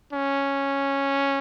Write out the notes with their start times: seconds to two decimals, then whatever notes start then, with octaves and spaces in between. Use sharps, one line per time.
0.13 C#4